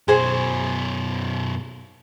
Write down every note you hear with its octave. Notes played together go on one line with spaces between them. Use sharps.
F#2 B2 G#4 C5 G#5